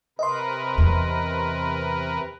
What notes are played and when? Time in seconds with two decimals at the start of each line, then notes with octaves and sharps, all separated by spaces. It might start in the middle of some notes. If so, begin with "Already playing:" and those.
0.19 C3 A#4 B4 D#5 C6
0.78 E2 C4